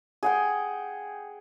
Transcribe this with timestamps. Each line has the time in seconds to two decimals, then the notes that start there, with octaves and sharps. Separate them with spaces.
0.23 G#4 F#5 G5